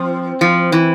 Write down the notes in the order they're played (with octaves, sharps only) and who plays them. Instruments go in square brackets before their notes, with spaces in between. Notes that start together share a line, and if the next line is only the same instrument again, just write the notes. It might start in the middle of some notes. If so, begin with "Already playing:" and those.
Already playing: [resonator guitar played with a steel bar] F3 [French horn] C4
[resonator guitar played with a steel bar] F3
E3